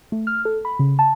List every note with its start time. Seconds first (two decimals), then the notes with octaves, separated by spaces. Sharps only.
0.12 A3
0.27 F6
0.45 A4
0.65 B5
0.79 C#3
0.99 A5